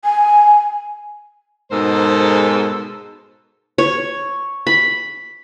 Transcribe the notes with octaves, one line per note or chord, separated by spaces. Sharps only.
G#5
G#2 B2 G#3 A4 A#4 C5
C#5
B5